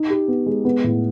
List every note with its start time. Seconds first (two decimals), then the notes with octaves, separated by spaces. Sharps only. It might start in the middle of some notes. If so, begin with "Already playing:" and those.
Already playing: D#4
0.10 G4
0.28 B3
0.46 G#3
0.65 B3
0.84 A2